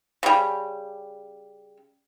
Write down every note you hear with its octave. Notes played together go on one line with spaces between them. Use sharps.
C#3 G3